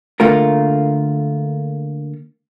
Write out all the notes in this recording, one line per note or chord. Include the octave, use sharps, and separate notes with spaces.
D3 A3 A#3 F4 A#4